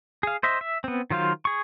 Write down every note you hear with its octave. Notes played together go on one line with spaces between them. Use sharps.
G#4 F5
C5 D#5 E5
E5
B3 C4
D#3 F#3 F4 C5 F5
G#4 C#6